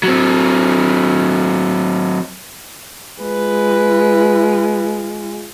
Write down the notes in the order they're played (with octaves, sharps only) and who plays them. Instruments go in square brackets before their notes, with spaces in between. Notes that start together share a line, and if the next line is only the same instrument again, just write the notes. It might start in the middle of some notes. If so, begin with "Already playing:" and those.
[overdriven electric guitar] F#3 C4
[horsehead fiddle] G#3 F4 [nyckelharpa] B4